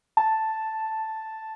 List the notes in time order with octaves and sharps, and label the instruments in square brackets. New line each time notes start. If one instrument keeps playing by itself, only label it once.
[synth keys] A5